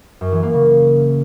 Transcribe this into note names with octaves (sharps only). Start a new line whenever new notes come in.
F#2
E3
A#3
C#3